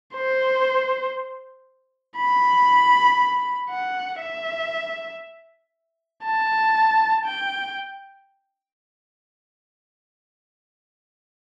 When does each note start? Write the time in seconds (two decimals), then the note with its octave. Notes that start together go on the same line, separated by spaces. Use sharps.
0.15 C5
2.17 B5
3.70 F#5
4.21 E5
6.24 A5
7.26 G5